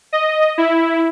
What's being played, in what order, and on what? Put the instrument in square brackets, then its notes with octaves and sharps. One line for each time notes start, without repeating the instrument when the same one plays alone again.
[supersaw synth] D#5
E4